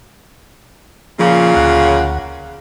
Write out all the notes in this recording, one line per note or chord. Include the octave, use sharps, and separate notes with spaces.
A#2 C#3 F3
D2 F#5